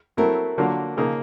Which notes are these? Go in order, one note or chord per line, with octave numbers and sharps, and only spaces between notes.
F#3 A3 C4 E4 A#4
D3 F#3 A#3 D4 F4
C#3 F3 A#3 D#4 G#4